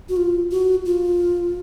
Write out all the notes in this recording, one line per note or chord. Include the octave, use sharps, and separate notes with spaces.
F#4
F4
F#4
F4